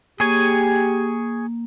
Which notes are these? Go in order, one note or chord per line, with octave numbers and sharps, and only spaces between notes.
A#3 G4 G#4 C#5 G#5